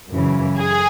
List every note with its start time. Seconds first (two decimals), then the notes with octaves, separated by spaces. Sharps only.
0.11 F#2 C#3 E3
0.58 G#4 G#5